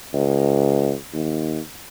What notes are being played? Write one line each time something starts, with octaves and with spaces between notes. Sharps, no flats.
C#2
D#2